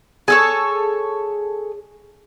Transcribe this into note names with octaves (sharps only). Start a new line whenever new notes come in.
G#4 A4 C#5